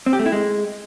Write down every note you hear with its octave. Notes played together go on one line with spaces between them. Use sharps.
C4
G4
A3
E4
G#3